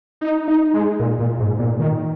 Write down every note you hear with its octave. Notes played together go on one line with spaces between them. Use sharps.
D#4
D#4
G#3
A#2
A#2
G#2
A#2
D#3